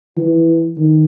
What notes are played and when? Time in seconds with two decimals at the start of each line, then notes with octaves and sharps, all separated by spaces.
0.17 E3
0.77 D#3